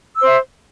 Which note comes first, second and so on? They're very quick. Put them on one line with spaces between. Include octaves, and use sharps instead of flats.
E6 C5 E5